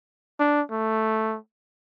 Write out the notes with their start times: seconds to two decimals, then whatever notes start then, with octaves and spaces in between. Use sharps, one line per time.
0.40 D4
0.71 A3